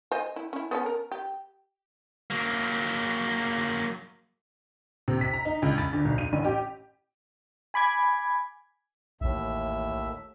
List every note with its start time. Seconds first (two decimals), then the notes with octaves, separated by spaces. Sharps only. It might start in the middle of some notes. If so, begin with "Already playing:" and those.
0.12 C5 D#5 G#5
0.36 E4
0.53 C#4 E4
0.71 B3 C#4 A4
0.86 A#4
1.11 G4
2.30 F#3 A#3
5.08 C3
5.21 B6
5.33 A#5
5.45 D#4
5.62 C#2
5.78 A6
5.93 D2
6.05 B1
6.18 D#7
6.33 A1
6.45 G4
7.74 G#5 B5 D6 G#6
9.21 A1 D#2 A2 E5